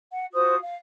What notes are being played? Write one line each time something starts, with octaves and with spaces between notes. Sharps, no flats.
F#5
F4 F#4 C5 D#6
F5